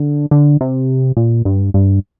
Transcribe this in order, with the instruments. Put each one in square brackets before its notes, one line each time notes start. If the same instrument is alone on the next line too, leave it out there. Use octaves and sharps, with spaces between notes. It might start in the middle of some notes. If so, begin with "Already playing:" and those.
Already playing: [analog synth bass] D3
D3
C3
A#2
G2
G2